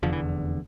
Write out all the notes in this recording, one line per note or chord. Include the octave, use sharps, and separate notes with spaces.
F1 E2 D3 F3
E3